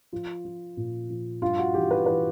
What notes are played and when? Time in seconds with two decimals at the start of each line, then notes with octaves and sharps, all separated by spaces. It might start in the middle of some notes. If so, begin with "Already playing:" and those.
0.12 F3 F4
0.45 F3
0.77 A#2
1.10 F3
1.42 G2 F4
1.58 F#4
1.74 E3 G4
1.91 B4
2.06 E3 B4